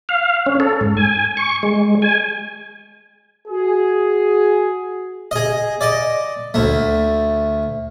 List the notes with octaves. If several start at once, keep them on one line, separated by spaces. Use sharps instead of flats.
F5
C#4
A4
G#2
G#5
C#6
G#3
G#5
F#4 G#4
G#4 D#5
D5 D#5
D2 A3